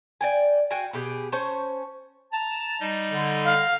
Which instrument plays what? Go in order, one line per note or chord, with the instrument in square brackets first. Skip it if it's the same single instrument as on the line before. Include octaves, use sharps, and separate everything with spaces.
[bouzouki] D5 G5 G#5
F#4 F5 G5 G#5
B2 G4 G#4
C#4 C5 C#5 A5
[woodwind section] A5 [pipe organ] A#5 A6
[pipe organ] G3 D#4 D#5
[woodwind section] D3
[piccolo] F5